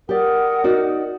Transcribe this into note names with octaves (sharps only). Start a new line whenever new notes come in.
G4 A#4 D5 F#5 D#6
D#4 F#4 D5